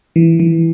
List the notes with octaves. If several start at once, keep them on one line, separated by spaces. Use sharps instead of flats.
E3
E3